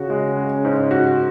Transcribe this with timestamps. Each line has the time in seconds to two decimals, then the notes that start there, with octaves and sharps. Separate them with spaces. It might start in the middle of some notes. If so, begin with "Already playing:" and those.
Already playing: C#3 F#4
0.10 G#3
0.37 C#4
0.65 G#2
0.91 F#4